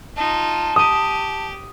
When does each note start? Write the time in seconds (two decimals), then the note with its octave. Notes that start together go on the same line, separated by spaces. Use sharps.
0.17 D#4 F4 A5
0.76 G4 D#6 D#7